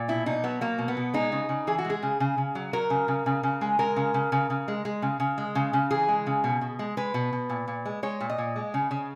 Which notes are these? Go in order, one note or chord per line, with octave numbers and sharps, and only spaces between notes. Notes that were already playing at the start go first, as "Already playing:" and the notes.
Already playing: A#2
B2 E4
B2 D#4
F#3 B3
F#3 A#3
B2
B3
B2
G#3 D#4
C#3
C#3
E3 G#4
F#4
G#3
G#4
C#3
C#3
C#3
F#3
F#3 A#4
C#3
C#3
C#3
C#3
G#3
G#3 A#4
C#3
C#3
C#3
C#3
G#3
G#3
C#3
C#3
G#3
C#3
C#3
E3 G#4
G#3
C#3
B2
B2
G#3
G#3 B4
B2
B2
A#2
A#2
G#3
G#3 C#5
A#2
D#5
A#2
G#3
C#3
C#3